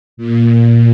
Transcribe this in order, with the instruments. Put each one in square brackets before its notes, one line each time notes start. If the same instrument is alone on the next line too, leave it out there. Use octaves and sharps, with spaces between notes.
[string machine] A#2